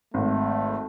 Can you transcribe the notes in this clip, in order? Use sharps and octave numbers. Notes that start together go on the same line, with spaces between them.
G#1 A3